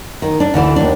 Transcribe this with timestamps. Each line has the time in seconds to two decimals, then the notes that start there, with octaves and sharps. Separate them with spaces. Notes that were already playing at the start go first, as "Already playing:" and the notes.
0.22 D#3
0.40 D4
0.54 D2 D3 E3
0.76 D#2 D4